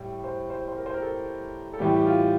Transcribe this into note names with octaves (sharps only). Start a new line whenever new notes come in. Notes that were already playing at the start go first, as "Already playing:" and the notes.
Already playing: A2 G3
C5
C5
C5
A#4
C5
A#4
A4
A4
A2 E3 G3 G4
G4
F4